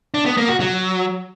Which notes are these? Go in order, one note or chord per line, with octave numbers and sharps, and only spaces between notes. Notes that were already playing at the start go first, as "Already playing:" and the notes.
D4
B3
A#3
F#4
F#3